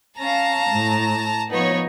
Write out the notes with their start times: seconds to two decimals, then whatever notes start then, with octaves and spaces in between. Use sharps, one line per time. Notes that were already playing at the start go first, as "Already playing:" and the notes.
0.19 C#4 F5 A5 A#5
0.71 A2
1.51 F3 B3 D#4 C#5